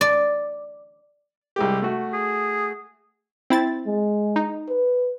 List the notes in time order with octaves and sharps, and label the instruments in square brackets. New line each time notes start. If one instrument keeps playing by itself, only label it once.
[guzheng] D5
[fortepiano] C2 G#3 G4
A3 F#4
[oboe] G#4
[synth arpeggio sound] C4 E4 A6
[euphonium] G#3
[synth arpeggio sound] D#4
[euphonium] B4